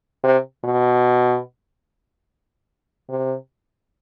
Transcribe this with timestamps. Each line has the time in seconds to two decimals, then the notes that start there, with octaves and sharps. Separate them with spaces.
0.24 C3
0.64 B2
3.09 C3